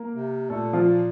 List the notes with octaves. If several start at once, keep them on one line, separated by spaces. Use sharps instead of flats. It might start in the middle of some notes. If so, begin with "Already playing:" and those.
Already playing: A#3 A#4
C3
A#2 A3 A4
F3 F4